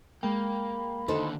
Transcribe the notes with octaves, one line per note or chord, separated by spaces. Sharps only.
G#3 A#3 G5 B5
D#2 D3 D#4 A4 C5